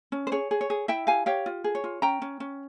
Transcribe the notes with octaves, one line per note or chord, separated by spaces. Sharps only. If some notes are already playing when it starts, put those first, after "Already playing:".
C#4
C5
G#4 C#5
G#4
C#5
G#4
E4 E5 G5
G4 F5 G#5
G4 C#5 F5
F4
G#4
C#5
F4
C#4 G5 A#5
C#4
C#4